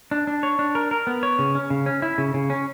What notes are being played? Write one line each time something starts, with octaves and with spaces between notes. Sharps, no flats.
D4
D4
C#5
D4
A#4
A#4
B3
C#5
C#3
C#4
C#3
C#4
E4
C#3
C#3
C#4